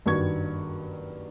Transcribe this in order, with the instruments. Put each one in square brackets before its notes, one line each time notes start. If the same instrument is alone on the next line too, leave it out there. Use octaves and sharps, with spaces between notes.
[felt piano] F#1 G2 D#3 F#4 C#6 G#6